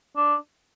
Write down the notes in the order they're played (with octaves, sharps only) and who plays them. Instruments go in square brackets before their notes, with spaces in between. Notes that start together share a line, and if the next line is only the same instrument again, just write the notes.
[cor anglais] D4